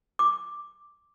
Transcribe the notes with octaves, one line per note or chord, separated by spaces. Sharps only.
D6